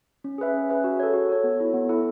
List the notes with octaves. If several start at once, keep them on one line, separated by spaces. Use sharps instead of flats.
C#4
G#4 B4 E5
C#4
G#4 B4 E5
F#4
A4 C#5
F#4
A4 C#5
B3
E4 A4
B3
E4 A4